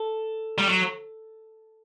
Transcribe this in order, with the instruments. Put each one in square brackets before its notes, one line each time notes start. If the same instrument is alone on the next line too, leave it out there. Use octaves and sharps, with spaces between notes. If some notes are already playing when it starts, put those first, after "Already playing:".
Already playing: [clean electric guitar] A4
[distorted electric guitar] G3
F#3